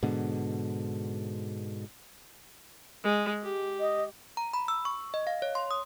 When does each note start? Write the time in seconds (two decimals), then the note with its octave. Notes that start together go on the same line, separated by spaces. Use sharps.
0.03 G#2 B2 D3
3.04 G#3
3.43 G4
3.80 D#5
4.37 A#5
4.54 B5
4.68 E6
4.85 C#6
5.14 D#5
5.27 F5
5.42 C#5
5.55 C6
5.71 D#6